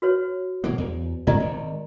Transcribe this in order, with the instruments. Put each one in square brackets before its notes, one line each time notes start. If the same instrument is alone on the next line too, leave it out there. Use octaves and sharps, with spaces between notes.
[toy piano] F#4 B4 C#5
[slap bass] B2 E3 A#3
E2
[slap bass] G2 C3 A#3 [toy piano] D5 D#5 A#5
[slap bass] G#1